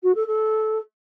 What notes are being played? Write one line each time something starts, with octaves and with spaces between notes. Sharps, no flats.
F#4
A4
A4